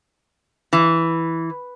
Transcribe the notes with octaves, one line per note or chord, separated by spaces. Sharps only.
E3